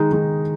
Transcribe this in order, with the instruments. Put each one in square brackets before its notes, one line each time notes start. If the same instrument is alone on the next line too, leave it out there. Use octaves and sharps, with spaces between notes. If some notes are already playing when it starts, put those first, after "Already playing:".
Already playing: [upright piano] D#3 G#3 D#4
D#3 G#3 D#4